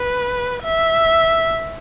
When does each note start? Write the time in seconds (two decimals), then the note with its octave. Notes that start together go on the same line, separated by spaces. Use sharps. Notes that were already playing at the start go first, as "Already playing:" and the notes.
Already playing: B4
0.63 E5